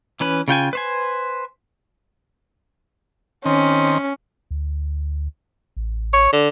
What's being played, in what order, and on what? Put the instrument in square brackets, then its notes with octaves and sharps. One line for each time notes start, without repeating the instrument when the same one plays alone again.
[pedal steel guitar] E3 C#4 B4
C#3 F4 G5 G#5
B4 C5 G#5
[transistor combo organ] D#3 C4 [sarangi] C#4
[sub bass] D2
A1
[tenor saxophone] C#5
D3